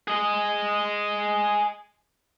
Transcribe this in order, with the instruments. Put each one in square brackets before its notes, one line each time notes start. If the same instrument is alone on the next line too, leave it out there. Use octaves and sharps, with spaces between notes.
[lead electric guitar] G#4 D#5